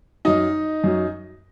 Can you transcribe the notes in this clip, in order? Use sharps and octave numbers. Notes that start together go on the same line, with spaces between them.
F#2 F#3 D#4 D#5
F#2 F#3